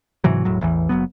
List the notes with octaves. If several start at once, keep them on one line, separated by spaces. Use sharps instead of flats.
G#2 C3 E3 F#3
E1 A2 F#3
A1 E2 E3
F#1 E2 F#3 B3